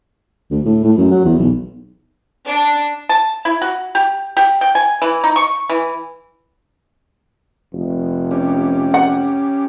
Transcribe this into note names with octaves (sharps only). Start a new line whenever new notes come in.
D2
A2
A2
F#2
F#3
E2
B1
D4
A5
E4
F#4
G4
G4
G5
G#5
E3
D#4
C#6
E3
F1
C#4 G4
F#5